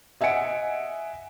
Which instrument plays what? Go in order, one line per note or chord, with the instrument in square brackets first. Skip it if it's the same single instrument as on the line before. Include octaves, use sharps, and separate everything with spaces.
[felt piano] D#5 E5 F#5 G#5 C#7 D7